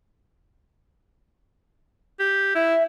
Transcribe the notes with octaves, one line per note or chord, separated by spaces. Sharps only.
G4
E4 E5